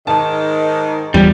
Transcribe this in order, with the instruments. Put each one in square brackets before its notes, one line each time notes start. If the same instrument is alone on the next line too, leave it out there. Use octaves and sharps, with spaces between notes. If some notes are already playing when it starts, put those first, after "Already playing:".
[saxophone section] G#2 D#3 [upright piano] A5
[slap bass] E2 F3 [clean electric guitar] G3